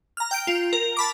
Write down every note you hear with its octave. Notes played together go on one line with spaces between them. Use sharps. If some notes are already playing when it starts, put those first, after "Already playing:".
A#5 F6
G5 G6 D7
F4
A#4
A5 B5 D6